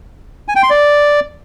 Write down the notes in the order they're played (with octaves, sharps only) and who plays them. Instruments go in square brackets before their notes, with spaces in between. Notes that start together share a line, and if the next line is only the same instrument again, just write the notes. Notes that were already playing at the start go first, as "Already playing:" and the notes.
[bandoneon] G#5
G5
C6
D5